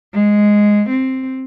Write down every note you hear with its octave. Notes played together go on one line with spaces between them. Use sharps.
G#3
C4